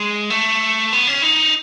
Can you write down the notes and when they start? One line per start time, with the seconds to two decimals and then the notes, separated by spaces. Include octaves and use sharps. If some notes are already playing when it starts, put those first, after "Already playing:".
Already playing: G#3
0.30 A3
0.93 B3
1.07 C#4
1.22 D#4